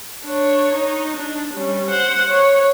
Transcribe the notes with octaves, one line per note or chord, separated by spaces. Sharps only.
D4 C#5
D#4
D4
G3 C#4
C5 F#5
C#5